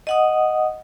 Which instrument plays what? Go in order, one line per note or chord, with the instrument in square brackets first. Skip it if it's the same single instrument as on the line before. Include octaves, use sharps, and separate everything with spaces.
[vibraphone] D#5 F#5 D#6